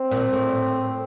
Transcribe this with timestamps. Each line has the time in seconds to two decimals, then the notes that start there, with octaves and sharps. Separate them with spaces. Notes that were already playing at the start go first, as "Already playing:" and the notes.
Already playing: C4
0.11 A#2
0.33 A2